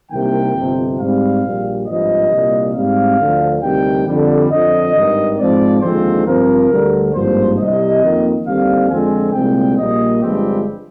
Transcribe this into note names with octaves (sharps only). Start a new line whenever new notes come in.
C2 C3 D#3 A#3 G5
G1 F2 C3
G#2 G3 C4 F5
A#1 A#2 G3
G#1 G2 F3 D#5
C2 A#2 G3
G#2 G3 C4 F5
D2 D3 F3
D2 C3 D#3 G3 G5
F2 D3 G3
F2 D3 F3 D#5
G#1 G2 D#3
G#2 F3 G#3 C4 D5
D#2 D3 F3 G#3 C4 C5
G2 F3 C4 A#4
D2 D3 G3
G#1 G2 F3 A#3 C5
C2 C3 G3 C4 D#5
F2 D#3 A#3
D#2 D3 G3 C4 F5
F2 D3 F3 G#3 C4 G#5
C2 A#2 G#3 C4 G5
A#1 A#2 G3 A#3 D#5
G1 G2 F3 G#3 C4 G4